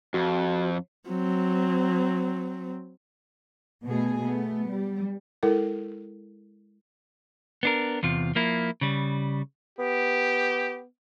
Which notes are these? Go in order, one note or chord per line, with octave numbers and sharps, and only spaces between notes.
F2 F#4
F#3 C4
B2 A3 B3 G#4
A3 B3
G3
G#3 E4 A4 A#4
B3 D4 A#4
E2 C3 F4
F3 A#3 E4
C#3 G3
B3 G4